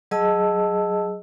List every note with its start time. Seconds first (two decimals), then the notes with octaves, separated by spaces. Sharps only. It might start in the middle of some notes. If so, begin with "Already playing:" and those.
0.11 F#3 G#4 D#5 A5 E6